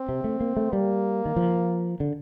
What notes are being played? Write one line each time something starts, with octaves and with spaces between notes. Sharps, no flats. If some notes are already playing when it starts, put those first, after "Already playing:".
Already playing: C4
C3
A3
A#3
A3
G3 A#3
D#3
F3
D3